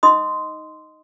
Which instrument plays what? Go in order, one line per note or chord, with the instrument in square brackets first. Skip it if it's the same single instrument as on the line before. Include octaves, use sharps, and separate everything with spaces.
[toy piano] D#4 D#5 C6 D#6